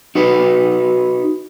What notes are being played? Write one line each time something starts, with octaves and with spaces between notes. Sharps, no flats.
D#4 F#4 B4